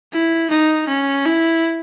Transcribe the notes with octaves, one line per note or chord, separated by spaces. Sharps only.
E4
D#4
C#4
E4